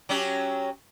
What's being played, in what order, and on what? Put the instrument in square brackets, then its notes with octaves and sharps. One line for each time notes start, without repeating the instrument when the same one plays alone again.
[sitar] F#3 C#4 G4